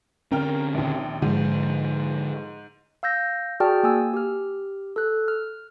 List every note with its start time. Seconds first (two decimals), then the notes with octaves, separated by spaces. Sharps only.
0.32 D3 C4 C#4 A#4 G5 F6
0.74 A#1 D#2
1.22 G#2 D3 F3 G#3
3.03 F5 E6 G6 A#6
3.60 F#4 G#4 D5 G5 A5 F6
3.83 A#3 G#5 E6
4.14 G4 F6
4.96 A4 F#6
5.28 F6